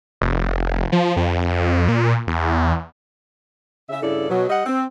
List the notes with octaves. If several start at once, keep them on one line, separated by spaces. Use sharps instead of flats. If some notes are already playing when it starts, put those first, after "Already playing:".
F1
F3
F2
A#2
E2
C#3 E5
G2 C#3 E4 A4 D5
B2 F#3
G3 D#5 F#5
C4